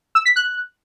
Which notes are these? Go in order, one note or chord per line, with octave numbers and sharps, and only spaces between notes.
E6
B6
F#6